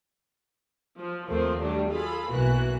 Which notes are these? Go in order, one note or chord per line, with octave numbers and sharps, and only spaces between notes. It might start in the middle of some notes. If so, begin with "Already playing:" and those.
F3
D#2 F3 A3 A#3 C4
F#3 G3 A3 D4
F4 G#4 A4 B5
B1 E3 A#3 F#4 F#6